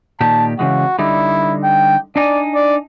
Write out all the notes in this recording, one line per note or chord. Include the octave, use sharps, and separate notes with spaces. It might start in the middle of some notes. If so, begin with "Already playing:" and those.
A#2 D#3 G4 A5
C#3 E3 G#3 F#4
D3 G3 D#4 E4
G5
D4 D#4 D5 G#5
D5